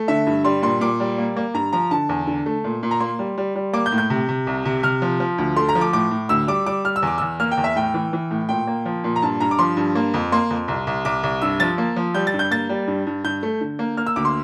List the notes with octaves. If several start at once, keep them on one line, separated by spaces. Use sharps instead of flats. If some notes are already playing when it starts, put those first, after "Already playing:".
Already playing: A3
D3 E5
G2
G3 C6
A#2 C6
A#2 D6
G3
A#3
A#3
G2 A#5
F3 A#5
D3 A5
E2
D3
A3
A#2
A#2
A#5
A#3 C6
G3
G3
G3
A#3 D6
G6
A2
G6
C3
C3
C2
C3
C3 F6
F3
F3
D2
A3 C6
A#5
F3
D6
A2 D6
A2
D2 E6
G3 D6
G3 D6
G3 F6
E6
E2 D6
E2 E6
A#3 F6
G5
E2
E5
A2 G5
E3
E3
A2
A#2 G5
A#3
F3
A#2
A#5
G2 A5
G2 A#5
D6
F3 C6
G2
A#3
F2
A#3 C6
F2
C2
C2
C2 D6
C2
G2 E6
F3 A6
A#3
F3
G3 G6
A6
G2
G6
A#3 A6
G3
G2
G2
G2 G6
A3
D3
A#3
A#3 F6
E6
D2 D6
C6